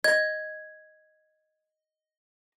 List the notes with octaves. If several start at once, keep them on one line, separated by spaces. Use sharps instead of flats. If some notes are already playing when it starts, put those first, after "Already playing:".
D#5 G#6